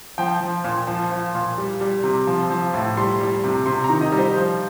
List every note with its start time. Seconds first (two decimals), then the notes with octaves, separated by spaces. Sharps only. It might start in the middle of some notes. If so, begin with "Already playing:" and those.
0.18 F3 G5
0.41 F3
0.64 A#2
0.87 F3
1.11 F3
1.35 A#2
1.58 G3
1.81 G3
2.04 C3
2.27 F3
2.50 F3
2.74 A2
2.97 G3 C6
3.20 G3
3.44 C3
3.66 C3 C6
3.84 A#5
3.89 D#3
4.01 D#5
4.12 G3
4.18 C5
4.37 F3